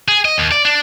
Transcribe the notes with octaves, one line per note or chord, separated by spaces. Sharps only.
G#4
D#5
D#2
D5
D4